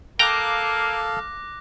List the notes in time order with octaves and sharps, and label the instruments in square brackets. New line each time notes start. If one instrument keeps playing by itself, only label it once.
[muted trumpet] A#3 [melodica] A4 F5 [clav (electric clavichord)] G5 A#5 [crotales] D6 F#6 A#6